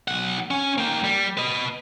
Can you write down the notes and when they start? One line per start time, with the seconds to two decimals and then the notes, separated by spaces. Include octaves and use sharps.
0.08 B1 F#5
0.51 C#4
0.78 A#3 G5
1.04 G3
1.37 B4 D#5